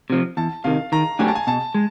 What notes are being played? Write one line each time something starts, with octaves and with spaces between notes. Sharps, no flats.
C3 F3
E2 A5
C3 D#3 F5
D#3 A#5
F#3 A3 D4 G4 G#5
A5
G#5
B2 A5
G#3